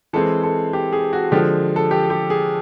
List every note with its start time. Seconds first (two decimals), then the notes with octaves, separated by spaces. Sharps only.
0.13 E3 G#3 C4 A4
0.43 A4
0.73 G4
0.93 G#4
1.13 F#4
1.32 D3 F3 G#3 G4
1.76 A4
1.91 G4
2.10 G4
2.30 G#4